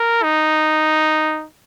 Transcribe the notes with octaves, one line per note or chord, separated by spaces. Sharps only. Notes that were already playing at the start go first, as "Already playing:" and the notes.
Already playing: A#4
D#4